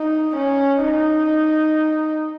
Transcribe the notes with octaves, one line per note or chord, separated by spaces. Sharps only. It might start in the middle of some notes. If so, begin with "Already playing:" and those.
Already playing: D#4
C#4
D#4